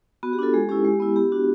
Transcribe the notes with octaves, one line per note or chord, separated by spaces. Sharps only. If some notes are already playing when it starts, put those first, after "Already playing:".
B3 F#4
G4
D4 F4 A4
G#3 G#4
C#4 E4 G4
G#3
B3 E4
B3 G4
D4 F#4